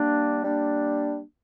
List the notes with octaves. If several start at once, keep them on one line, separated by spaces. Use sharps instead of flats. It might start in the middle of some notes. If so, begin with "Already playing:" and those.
Already playing: G3 A#3 D4
G3 A#3 D4